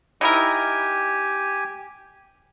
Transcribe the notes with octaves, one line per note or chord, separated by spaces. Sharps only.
D#4 E4 G4 A#4 G#5